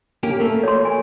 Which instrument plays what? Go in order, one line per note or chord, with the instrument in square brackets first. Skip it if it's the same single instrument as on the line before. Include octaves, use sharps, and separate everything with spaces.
[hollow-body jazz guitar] A#3 C#4 G4
A3 A#3
[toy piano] C#5 C6
G#5